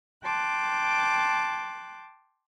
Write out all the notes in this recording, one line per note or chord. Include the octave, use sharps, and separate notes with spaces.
G5 A5 C6 D6 F#6